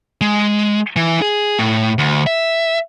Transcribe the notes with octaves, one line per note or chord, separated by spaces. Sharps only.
G#3
E3
G#4
A2
D2
E5